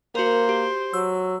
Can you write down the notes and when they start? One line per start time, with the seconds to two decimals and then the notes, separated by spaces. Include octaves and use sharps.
0.15 A#3 F#4 A#4 C5
0.49 G4
0.93 F#3 E6